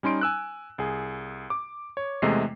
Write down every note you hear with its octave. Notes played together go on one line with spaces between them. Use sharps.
G3 C#4 D#4 C6 D7
G#5 E6 F#6
C2 G#4
D6
C#5
E2 C3 G#3 A3 D#5 C7